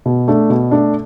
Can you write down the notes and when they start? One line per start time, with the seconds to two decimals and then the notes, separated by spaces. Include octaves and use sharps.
0.06 B2
0.28 A3 D4
0.50 B2
0.71 A3 D4